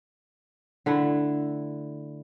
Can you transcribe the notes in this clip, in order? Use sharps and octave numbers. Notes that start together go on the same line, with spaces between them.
D3 A3 E4